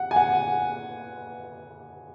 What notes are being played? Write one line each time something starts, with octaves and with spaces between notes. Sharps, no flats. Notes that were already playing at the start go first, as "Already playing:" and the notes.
Already playing: F#5
G#5
F#5